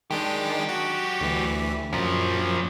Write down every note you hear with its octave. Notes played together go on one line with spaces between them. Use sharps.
D#3 F#3 G#3 D4 G4
F#4
D2 E3
F#2 A#2 F3